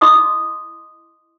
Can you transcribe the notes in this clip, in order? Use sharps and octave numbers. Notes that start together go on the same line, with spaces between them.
E4 D#5 C6 D6 D#6